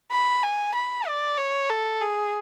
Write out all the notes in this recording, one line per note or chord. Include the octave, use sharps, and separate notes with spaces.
B5
G#5
B5
D5
C#5
A4
G#4